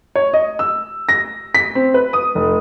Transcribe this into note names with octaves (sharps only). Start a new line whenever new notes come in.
C#5
D#5
E6
A#6
B6
C4
B4
D#6
F1